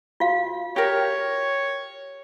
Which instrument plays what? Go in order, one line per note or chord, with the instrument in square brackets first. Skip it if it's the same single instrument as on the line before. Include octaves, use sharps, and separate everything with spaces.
[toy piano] F4 F#4 F5
[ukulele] G4 A#4 [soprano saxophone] C#5